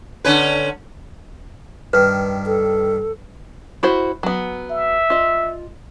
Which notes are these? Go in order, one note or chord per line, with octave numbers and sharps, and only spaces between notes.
D3 C#4 B4
G2 D#3 B4
A4
E4 F#4 C5
F#3 B3
E5
F4 D#5